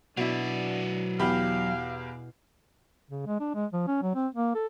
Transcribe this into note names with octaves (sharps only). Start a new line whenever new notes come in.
B2 F#3 D4 E4 D5
E2 G4 F5 B5
C#3
G#3
D4
G#3
F3
C#4
F#3
C4
A#3
A4